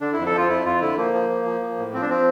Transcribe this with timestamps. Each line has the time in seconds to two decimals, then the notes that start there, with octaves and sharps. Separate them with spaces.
0.01 D3 D4
0.13 F2 E4
0.26 A4
0.33 F3 F4
0.49 F2 E4
0.65 F2 F4
0.81 D3 E4
0.97 F3 A#3
1.14 F3
1.29 F3
1.45 F3
1.61 F3
1.78 A2
1.93 F3 C4
2.02 D4
2.10 F3 C4